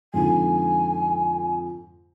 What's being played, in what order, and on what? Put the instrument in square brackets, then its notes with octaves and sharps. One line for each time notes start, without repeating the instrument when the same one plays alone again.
[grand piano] F2 G#2 D3 [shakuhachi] G#5